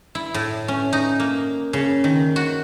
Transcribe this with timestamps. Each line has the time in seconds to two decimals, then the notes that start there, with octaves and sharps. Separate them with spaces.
0.15 E4
0.34 A2
0.68 C#4
0.93 D#4
1.20 A#3
1.73 C#3
2.04 D#3
2.36 F#4